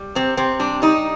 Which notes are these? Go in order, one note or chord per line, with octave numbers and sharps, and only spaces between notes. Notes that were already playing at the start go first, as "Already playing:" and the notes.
Already playing: G3
C3 C4
C3 C4
G3 D4
G3 D#4